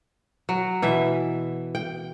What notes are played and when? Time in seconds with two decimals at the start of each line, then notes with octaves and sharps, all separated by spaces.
0.49 F#3
0.82 B2 E3 E5
1.75 G5